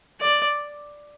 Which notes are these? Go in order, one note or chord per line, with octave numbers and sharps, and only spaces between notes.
D5